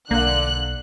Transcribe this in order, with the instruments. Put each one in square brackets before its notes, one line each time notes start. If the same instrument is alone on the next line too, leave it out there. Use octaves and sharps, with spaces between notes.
[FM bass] B1 [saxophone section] D3 [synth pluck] A#3 [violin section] F#6